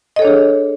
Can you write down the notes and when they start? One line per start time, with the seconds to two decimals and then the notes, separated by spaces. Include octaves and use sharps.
0.16 D#5
0.19 A4
0.22 C#5
0.25 D4
0.27 G#4